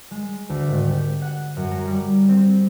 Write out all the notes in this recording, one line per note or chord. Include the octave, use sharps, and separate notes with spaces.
G#3
D2
G#1
G4
F#5
F#2
A#5
G3
C4